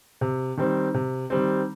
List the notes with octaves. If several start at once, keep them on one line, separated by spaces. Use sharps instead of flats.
C3
D#3 G3 C4
C3
D#3 G3 C4